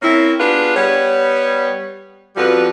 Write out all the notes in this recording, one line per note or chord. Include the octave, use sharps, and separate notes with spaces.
A#3 C4 C#4 E4
B3 D4 F4 G4 G#4 B4
G3 B3 C#5
F2 F3 G3 B3 F#4 B4